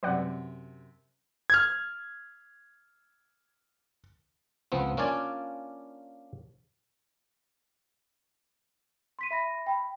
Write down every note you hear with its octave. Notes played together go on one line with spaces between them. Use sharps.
F#2 C3 B4 D5 F#5
F6 G#6
C#2 F3 B3 C4
A#3 C#4 D4 F4 D5 G#5
C6 B6 D#7
E5 B5 A#6
G5 B5